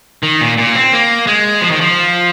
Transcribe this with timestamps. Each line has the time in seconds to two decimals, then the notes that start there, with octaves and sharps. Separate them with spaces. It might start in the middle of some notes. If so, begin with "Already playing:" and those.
0.23 D#3
0.41 A#2
0.58 A#2
0.75 C4
0.93 A#3
1.27 G#3
1.61 F3
1.71 D#3
1.81 F3